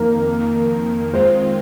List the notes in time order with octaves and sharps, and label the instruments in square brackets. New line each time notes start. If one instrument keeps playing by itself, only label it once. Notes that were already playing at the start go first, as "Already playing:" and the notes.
Already playing: [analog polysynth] F2 D#3 A#3 [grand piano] A#4
[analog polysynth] F2 D#3 A#3
[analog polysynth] D#3 G#3 C4 F4 [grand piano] C5